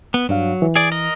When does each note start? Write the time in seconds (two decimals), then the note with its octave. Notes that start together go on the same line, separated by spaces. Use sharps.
0.14 B3
0.29 G2 F#3 D4 F5
0.62 E3
0.76 G#4 D5
0.91 A#4 D#5